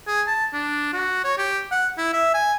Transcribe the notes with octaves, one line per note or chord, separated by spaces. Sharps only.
G#4
A5
D4
F#4
C#5
G4
F#5
E4
E5
G#5